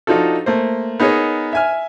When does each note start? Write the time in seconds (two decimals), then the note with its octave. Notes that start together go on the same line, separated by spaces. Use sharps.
0.07 F3 D4 D#4 F4 F#4 A4
0.46 A3 A#3 C5
1.00 B3 D#4 G#4 A#4 C#5
1.53 E5 G#5 F6